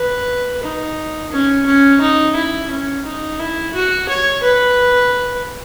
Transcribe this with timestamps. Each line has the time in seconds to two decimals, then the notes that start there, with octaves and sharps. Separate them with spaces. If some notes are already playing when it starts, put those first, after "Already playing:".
Already playing: B4
0.63 D#4
1.32 C#4
1.66 C#4
2.01 D#4
2.36 E4
2.71 C#4
3.05 D#4
3.39 E4
3.74 F#4
4.08 C#5
4.43 B4